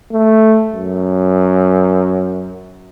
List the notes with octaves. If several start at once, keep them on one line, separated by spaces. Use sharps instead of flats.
A3
F#2